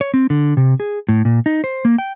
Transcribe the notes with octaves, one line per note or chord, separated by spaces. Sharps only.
C#5
C4
D3
C3
G#4
A2
A#2
D#4
C5
A#3
G5